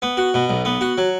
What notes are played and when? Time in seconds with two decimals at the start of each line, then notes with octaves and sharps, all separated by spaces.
0.02 B3
0.17 F#4
0.34 B2
0.50 B1
0.65 B3
0.81 F#4
0.98 F#3